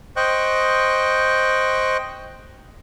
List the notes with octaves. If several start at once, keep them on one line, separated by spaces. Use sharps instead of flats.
C5 D#5 G5 C#6 F#6